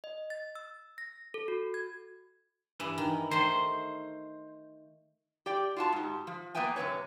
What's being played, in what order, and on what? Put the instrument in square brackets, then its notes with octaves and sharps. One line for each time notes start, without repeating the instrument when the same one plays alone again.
[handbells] D#5
A6
E6
A#6
A4
F#4
G#6
[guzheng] G2 [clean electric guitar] E3
[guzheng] D#3
[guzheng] D#3 A3 [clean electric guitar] C5 C6
[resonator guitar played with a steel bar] G4 D5 G5
F4 F#4 A5
G#2 G4
F3
A#3 B3 B4 E5 G5 G#5
F#2 C3 D#3 B4 C#5